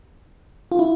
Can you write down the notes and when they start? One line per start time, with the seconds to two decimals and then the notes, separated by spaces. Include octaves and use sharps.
0.72 F4
0.79 E4